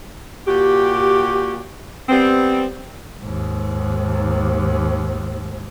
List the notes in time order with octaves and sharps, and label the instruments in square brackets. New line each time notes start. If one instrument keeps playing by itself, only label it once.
[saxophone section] A#2 F#4 G4
G3 B3 C4
[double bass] D#2 G#2